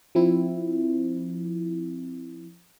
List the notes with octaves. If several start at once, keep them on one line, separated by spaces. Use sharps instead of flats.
F3 C4 E4